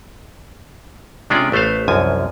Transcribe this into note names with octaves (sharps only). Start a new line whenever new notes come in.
C3 G#3 C#4 D4 F4 D5
A1 A3 B3 C5 F5
C2 F#2 F3 G#5